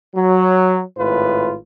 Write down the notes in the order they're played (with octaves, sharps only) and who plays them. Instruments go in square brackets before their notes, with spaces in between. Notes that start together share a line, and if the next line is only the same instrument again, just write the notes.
[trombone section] F#3
G#1 A2 F4 B4